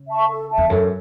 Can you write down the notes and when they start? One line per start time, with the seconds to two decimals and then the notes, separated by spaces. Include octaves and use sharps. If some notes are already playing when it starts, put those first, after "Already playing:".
Already playing: C#3
0.08 E5 A5 C#6
0.29 A4
0.50 E5 A5
0.58 E2
0.70 F#2 A4